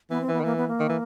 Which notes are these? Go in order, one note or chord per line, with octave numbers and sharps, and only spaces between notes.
E3 B3
C4
E3
B3
D#3
E3 A#3
B3
A#3
D#3
E3